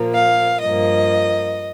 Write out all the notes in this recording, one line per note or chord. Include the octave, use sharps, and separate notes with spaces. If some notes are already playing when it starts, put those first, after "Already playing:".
Already playing: A#2 F3 A#3
F5
G2 F3 A#3 D#5